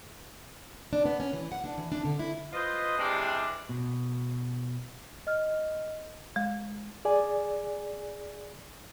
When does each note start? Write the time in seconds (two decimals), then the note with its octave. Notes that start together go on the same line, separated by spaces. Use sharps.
0.93 D4
1.05 B3
1.20 C#4
1.33 E3
1.52 F#5
1.64 D4
1.78 E3
1.92 D4
2.05 D3
2.19 E4
2.53 F4 B4 C5 D#5
2.98 C3 E3 G3 G#3 D4
3.69 B2
5.27 D#5 F6
6.36 G#3
7.05 G#4 D5 G#5